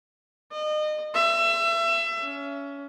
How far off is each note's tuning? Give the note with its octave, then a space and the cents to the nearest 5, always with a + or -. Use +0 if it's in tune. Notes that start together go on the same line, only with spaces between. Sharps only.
D#5 -30
E5 +30
C#4 +25